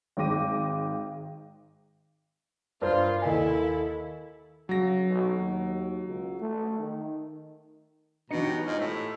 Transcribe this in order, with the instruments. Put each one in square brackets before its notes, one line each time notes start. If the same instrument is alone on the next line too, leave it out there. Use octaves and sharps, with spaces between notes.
[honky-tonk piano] G#1 G#2 G5 D6 A#6 D#7
[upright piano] G2 A#4 C5 [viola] F4
[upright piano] D#2 D#5 G#5 [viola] E4 A4
[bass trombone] C#3 [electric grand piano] F#3 A#6
[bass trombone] B1
D#2
C#2
A3
D#3
[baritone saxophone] B2 [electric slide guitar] E3 D4 D#5 [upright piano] D#4 C#7 [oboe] A#5
[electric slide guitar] G4 C#5 G5
[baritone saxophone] G#2 [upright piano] F4 D#5 [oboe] F5
[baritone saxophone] A2 [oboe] E5